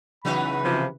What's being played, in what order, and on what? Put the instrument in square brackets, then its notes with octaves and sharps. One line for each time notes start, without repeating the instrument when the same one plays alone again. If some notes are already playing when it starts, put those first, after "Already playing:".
[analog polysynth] C#3 E3 B4 [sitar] F#3 B3 D#4 [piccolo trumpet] B5
[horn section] C3 F3